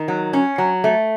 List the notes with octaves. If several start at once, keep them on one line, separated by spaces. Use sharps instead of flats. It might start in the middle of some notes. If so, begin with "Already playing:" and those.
Already playing: D#3
F#3
C#4
F#3
A3